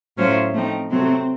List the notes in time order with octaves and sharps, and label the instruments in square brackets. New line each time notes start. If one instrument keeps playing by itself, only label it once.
[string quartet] A2 A3 C#4 F4 C5 [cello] F#3
[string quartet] F3 C4 D#4 [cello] A3
[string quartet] C3 F#3 A3 [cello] C4